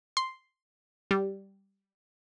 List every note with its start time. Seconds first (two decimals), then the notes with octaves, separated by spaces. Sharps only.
0.17 C6
1.11 G3